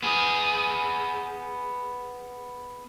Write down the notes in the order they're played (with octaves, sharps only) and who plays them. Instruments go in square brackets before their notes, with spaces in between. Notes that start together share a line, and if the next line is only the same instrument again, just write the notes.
[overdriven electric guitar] B3 G#4